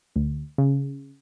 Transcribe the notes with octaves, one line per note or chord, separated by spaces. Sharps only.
D2
C#3